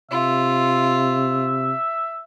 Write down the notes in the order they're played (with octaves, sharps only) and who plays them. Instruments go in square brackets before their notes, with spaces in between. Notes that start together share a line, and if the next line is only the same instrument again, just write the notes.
[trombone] C3 [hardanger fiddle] F4 [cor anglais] E5